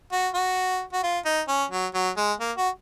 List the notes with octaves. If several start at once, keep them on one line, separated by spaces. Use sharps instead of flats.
F#4
F#4
F#4
F4
D#4
C#4
F#3
F#3
G#3
A#3
F#4